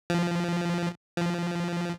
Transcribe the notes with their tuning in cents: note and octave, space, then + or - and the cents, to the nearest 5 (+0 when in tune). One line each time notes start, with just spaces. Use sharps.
F3 -15
F3 -15